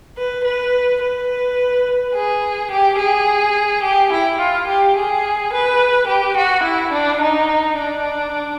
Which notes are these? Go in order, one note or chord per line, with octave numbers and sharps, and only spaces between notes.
B4
B4
B4
G#4
G4
G#4
G4
E4
F4
G4
G#4
B4
G4
F#4
E4
D4
D#4
D4